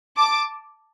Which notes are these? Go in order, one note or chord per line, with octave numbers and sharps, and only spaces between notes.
A5 D6